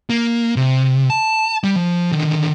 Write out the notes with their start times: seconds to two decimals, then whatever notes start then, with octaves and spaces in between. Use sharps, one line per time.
0.10 A#3
0.56 C3
1.10 A5
1.64 G3
1.76 F3
2.12 D3 D#3